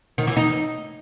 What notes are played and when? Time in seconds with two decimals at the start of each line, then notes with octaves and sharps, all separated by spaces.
0.18 D#3
0.27 E3
0.37 D#4